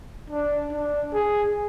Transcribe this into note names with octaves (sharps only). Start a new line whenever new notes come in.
D4
D4
G#4